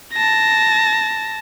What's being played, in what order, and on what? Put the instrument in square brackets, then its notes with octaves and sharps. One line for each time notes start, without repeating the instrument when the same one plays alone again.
[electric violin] A5 A#6